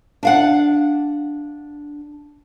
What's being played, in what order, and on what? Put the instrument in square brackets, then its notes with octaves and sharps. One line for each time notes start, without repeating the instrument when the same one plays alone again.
[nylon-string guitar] D4 F5 F#5